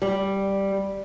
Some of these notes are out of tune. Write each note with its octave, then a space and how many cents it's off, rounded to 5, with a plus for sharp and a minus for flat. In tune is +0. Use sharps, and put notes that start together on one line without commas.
G3 +0